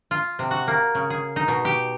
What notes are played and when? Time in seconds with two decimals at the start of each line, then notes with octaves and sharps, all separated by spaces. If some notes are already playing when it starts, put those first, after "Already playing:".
0.11 F4
0.39 C3
0.51 F#4
0.68 A#3
0.95 C#3
1.10 G#4
1.36 D#4
1.48 B2
1.65 G4